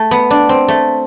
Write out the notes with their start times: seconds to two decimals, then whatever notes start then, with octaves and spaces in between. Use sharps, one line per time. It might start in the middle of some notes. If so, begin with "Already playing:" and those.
Already playing: A3
0.11 B3
0.30 D4
0.49 C4
0.68 A3